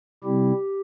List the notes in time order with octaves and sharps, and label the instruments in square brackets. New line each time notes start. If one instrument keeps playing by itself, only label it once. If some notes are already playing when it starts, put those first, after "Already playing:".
[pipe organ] C3 G3 C4 E4 G4